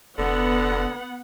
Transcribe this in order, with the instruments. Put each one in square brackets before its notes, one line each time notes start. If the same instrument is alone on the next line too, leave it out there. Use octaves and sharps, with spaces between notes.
[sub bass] F1 [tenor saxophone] D3 [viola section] B3 F#5